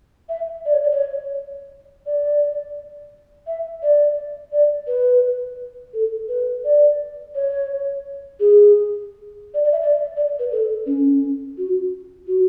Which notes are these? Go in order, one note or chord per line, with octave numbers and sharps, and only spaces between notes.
E5
D5
C#5
D5
C#5
D5
E5
D5
D5
B4
A4
B4
D5
C#5
G#4
D5
D5
E5
D5
D5
B4
A4
C#4
F#4
F#4